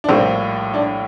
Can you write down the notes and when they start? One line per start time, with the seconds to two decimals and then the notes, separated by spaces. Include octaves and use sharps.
0.04 D4
0.09 A#1 A2 G3 A#3 C4
0.74 D4